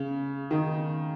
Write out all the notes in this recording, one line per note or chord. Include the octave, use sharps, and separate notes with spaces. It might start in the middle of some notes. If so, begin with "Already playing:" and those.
Already playing: C#3
D#3